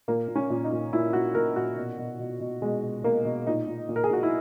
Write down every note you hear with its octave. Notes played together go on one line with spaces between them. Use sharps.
A#2 A#3
A#2
C#4
A#2
D#4
A#2
A#2 E4
A#2 F#4
A#2 A#4
A#2 F#4
B2
B2
B2
B2
B2 G#3
B2
B2 A#3
B2
A#2 D#4
A#2
A#2
A#4
G#4
A#2 F#4
E4